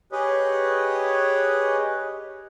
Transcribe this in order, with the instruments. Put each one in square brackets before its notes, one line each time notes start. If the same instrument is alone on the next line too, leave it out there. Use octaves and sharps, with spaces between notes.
[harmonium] G4 G#4 B4 C#5 D#5